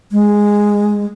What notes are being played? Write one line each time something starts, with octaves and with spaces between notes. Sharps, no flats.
G#3